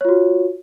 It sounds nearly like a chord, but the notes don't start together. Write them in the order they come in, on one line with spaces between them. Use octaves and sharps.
C#5 F4 F#4